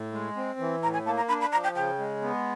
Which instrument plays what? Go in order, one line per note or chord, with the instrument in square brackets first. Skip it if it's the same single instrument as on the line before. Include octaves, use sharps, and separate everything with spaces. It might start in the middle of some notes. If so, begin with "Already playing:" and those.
Already playing: [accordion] A2
G#3
C4
E3
[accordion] A2 [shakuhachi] A#5
[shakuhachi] G#5
[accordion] A#3 [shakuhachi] A5
[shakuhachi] A#5
[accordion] D4 [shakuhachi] B5
[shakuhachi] B5
[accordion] F3 [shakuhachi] A#5
[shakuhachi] G5
[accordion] C#3 [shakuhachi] G5
[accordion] G#3
B3